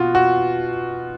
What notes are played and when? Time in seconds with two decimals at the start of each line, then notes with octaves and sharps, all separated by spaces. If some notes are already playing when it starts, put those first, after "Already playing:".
Already playing: B2 F4 F#4
0.15 F#4